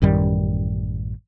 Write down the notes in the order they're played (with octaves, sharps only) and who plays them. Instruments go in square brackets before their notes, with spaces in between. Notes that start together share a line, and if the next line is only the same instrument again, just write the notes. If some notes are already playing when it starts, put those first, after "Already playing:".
[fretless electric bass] A1 F#2 D#3 G3